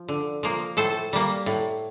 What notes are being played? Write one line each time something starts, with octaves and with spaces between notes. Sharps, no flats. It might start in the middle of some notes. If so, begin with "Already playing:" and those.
Already playing: F3
D3
F3 A#3
A2 A4 C5
G3 A#3
A2